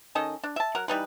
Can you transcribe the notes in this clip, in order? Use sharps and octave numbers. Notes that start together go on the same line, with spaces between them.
D#3 C#4 A4 D#5
D4
E5 A5
F#3 A#4 F#5
E3 G3 D#4 B4